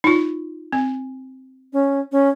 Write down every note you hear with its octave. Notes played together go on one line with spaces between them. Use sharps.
D#4 F4
C4
C#4
C#4